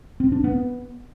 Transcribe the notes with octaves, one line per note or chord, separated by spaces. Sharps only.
C4
D4
B3